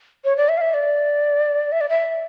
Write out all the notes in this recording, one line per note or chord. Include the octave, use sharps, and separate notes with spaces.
C#5
D5
E5
F5
E5
D5
E5
D5
E5